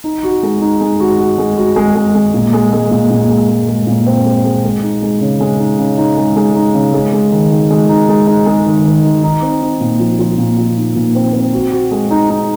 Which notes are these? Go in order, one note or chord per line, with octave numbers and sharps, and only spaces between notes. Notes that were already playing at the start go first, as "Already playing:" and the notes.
D#4
F#4
G#3
D#4
G#3
F#4
F#4
G#3
F#4
G#3
G#3
G#3
A#2
G#3
G#3
A#2
A#2
G#3
G#3
G#3
A#2
C4
G#3
G#3
G#3
D#4
G#3
C#3
G#3
D#4
C#3
D#4
G#3
G#3
D#4
C#3
G#3
G#3
D#3
D#3
G#3
D#4
G#3
D#4
G#3
D#3
D#3
D#3
D#4
C4
D#4
A#2
F3
F3
A#2
F3
D#4
A#2
C4
C4
F#4
F#4
G#3
D#4
D#4